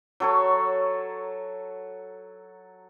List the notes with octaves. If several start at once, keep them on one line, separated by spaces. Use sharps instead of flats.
F#3 A4 C#5